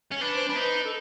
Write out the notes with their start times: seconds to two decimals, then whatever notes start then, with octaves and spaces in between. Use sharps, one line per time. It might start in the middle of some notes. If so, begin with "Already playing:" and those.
0.12 C#4
0.21 D4 B4
0.35 C5
0.49 D4 B4
0.56 D#4
0.85 A4